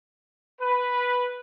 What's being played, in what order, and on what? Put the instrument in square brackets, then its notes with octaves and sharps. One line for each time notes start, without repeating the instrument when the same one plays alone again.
[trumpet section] B4